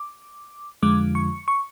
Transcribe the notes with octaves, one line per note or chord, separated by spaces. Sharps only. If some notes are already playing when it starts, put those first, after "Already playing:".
Already playing: D6
F2 D3 F3 G#3 D6
C#6
C#6